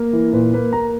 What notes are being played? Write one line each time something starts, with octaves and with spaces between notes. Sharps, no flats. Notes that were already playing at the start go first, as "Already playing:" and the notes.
Already playing: A#3 A#4
E3
A#2 B4
A#3 B4
A#3 A#5